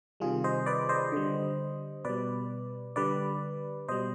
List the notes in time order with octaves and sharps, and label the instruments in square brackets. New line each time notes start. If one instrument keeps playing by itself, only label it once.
[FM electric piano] C3 D#3 G3 F4 G#4
C5 D#5
B4 D5
C5 D#5
D3 G3
B2 G3 B4 D5
D3 G3 B4 D5
B2 G3 C5 D#5